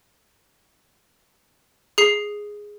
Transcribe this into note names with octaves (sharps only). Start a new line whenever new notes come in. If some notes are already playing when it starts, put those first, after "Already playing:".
G#4 C7